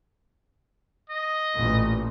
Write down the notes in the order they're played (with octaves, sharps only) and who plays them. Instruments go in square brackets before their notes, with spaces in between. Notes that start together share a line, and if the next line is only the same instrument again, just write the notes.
[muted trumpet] D#5
[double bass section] A1 A#2